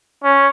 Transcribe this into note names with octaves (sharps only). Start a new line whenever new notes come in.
C#4